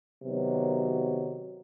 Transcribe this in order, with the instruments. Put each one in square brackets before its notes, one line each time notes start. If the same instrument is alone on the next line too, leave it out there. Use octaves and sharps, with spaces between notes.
[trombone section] C3 D#3 F#3 B3